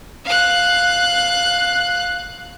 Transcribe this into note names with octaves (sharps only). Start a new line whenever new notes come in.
F5 F#6